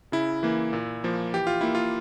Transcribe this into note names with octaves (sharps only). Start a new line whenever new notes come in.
C#3 E4
E3 A#3
A#2
F3 A#3
E3 G4
F4
A#3 E4
F4